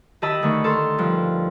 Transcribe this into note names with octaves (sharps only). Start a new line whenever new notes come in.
D#3 G4 D#5 A5 B5 E6
D3 D#3 A3 C#6
A4 A#4 C6
G2 F3